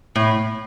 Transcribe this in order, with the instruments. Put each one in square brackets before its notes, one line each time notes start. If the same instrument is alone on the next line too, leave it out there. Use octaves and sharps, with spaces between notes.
[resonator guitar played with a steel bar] A2